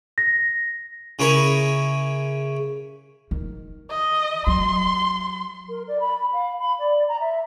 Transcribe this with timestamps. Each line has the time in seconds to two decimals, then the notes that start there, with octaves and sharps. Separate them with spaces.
0.18 A#6
1.19 C#3 C#4 E4 A#4 C#6
3.31 D#3
3.90 D#5
4.47 F#3 C6
5.69 A#4
5.88 D5
6.00 B5
6.33 F5
6.59 B5
6.79 D5
7.08 A#5
7.20 E5